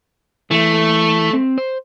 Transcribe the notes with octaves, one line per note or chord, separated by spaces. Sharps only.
E3 A3
C4
C5